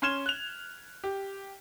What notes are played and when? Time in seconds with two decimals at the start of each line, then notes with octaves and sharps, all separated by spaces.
0.02 C#4 C6 F6 G#6 E7 G7
0.26 F#6 F7
1.04 G4